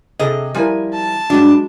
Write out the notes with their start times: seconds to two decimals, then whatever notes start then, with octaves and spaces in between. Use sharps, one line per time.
0.19 C3 G#4 A4 D#5
0.55 F3 G3 E4 A#4 G#5
0.93 A5
1.30 G2 F#3 G#3 D4